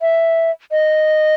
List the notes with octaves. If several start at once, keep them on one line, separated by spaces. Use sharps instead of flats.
E5
D#5